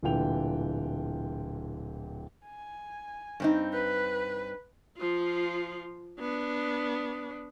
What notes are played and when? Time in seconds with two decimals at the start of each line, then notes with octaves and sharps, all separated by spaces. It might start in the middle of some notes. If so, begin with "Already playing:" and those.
0.03 D1 A#2 D3 E3 G5 F7
2.45 G#5
3.40 G2 C4 D#4
3.73 B4
4.97 F3 F4
6.20 B3 D4